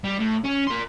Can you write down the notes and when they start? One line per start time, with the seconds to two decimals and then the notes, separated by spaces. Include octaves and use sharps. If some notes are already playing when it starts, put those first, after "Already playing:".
0.04 G3
0.19 A2
0.45 C#4
0.67 A#4 C6